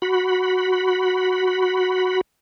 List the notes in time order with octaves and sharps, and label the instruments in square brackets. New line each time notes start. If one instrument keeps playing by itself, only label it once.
[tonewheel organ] F#4 B5